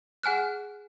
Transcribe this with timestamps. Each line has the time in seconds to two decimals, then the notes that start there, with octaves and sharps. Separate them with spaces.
0.23 G#4 F#5 G#5 F6 F#6